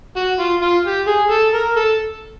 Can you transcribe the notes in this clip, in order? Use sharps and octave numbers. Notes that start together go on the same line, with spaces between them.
F#4
F4
F4
G4
G#4
A4
A#4
A4